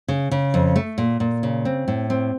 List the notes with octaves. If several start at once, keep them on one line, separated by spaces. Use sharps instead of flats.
C#3
C#3
F2
A3
A#2
A#2
C#3
C4
A2
C4